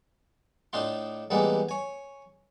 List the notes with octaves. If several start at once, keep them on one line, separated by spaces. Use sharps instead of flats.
A2 D4 D#4 F4 C6
A1 G3 G#3 A#3 B3 A4
C#5 G#5